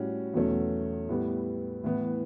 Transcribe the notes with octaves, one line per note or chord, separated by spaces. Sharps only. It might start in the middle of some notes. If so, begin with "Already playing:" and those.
Already playing: A2 G3 C#4 F#4
E2 B2 F#3 A3 C#4
A2 G3 B3
A2 E3 B3